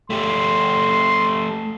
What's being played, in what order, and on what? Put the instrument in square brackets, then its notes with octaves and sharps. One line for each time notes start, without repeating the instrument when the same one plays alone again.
[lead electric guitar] A3 G4 [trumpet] C6